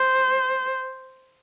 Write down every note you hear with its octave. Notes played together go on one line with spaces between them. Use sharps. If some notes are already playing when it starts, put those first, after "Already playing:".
Already playing: C5